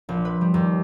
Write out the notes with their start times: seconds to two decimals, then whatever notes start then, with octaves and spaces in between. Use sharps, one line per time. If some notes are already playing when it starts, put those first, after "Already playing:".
0.09 A#1
0.25 B4
0.41 G3
0.54 D#2